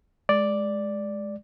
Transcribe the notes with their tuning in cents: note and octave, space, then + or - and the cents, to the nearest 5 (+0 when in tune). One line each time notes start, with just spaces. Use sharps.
G#3 +10 D5 +0